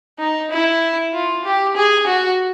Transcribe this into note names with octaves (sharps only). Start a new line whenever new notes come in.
D#4
E4
F4
G4
G#4
F#4